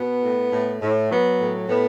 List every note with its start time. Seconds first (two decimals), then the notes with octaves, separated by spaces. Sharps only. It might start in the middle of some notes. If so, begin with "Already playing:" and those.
Already playing: B2 B3
0.23 A2
0.52 A2
0.81 A2
1.10 F#3 B3
1.40 A2
1.69 A2 B3